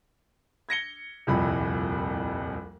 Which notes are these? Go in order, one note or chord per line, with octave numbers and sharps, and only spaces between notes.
G#6 A#6 C#7 G7
D#1 C2 F2 E4 B5